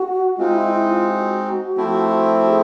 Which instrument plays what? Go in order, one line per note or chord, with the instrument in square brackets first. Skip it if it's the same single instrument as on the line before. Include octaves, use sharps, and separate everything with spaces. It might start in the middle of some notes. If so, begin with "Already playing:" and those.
Already playing: [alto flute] F#4
[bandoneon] G#3 C4 D#4 [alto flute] F4
[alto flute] E4
E4
F4
F#4
[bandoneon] F3 A3 C4 E4
[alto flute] G#4